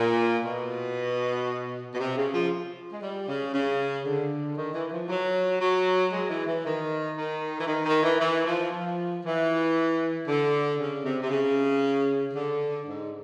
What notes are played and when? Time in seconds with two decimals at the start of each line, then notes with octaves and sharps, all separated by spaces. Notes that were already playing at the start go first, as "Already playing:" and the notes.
Already playing: A#2
0.43 B2
1.94 B2
1.99 C3
2.16 C#3
2.33 F3
2.92 G#3
3.01 G3
3.28 C#3
3.54 C#3
4.05 D3
4.57 D#3
4.74 E3
4.92 F3
5.09 F#3
5.60 F#3
6.13 G#3
6.30 E3
6.47 E3
6.65 D#3
7.17 D#3
7.60 E3
7.67 D#3
7.85 D#3
8.02 E3
8.20 E3
8.45 F3
8.71 F3
9.24 E3
10.27 D3
10.79 C#3
11.04 C3
11.23 C3
11.30 C#3
12.33 D3
12.86 G#2